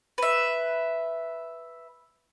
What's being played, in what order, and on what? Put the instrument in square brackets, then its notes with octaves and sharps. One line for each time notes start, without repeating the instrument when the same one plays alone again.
[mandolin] B4 E5